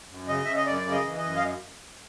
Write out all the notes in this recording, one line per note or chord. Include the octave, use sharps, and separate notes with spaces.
F#2
C#3 D#5
C#3 E5
D#5
F#2 D5
C#3
D#5
E3
D#5
F#2
F5